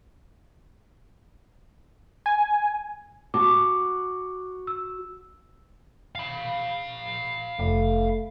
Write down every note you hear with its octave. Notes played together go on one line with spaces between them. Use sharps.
G#5
F#4 A5 D6
E6
F5 B5
F1 A3